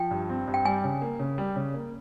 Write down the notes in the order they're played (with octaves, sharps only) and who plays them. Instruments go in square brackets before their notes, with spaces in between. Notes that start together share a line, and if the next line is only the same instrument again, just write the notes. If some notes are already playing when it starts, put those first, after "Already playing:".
Already playing: [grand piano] F3 [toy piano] G5
[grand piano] G2
C4
G2
[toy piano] G5
[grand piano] G3 [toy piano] G#5
[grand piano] C#3
A#3
C#3
G3
C#3
A#3